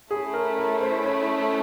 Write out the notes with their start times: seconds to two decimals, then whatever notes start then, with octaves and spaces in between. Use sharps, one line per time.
0.10 A3 C#4 E4 G#4
0.34 A#4
0.57 A#4
0.81 C5
1.04 C#5